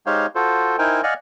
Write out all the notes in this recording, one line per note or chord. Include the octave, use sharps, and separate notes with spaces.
G#3 D#4 G4 C5 C#5 F5
F4 F#4 A4 C5
D#4 E4 A#4 C5 G5 G#5
D5 D#5 F5 F#5 G#5